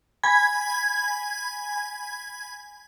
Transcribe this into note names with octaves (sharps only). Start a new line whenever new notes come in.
G#5 B5 G#6